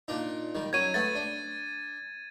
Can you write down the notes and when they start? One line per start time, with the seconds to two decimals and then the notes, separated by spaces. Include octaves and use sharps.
0.08 A#2 D4 D#4
0.55 D#3 G3
0.73 F#3 C#4 G#6 D#7
0.94 A3 B3 A6
1.15 D4